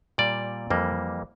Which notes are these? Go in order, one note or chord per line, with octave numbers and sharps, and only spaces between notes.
A#2 G3 A#3 D5
F2 E3 G3 A#3